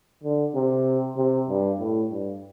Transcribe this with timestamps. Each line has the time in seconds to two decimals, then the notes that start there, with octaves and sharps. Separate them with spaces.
0.23 D3
0.55 C3
1.17 C3
1.49 G2
1.79 A2
2.11 G2